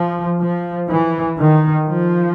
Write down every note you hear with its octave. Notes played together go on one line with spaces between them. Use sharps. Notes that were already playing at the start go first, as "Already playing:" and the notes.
Already playing: F3
F3
E3
D#3
F3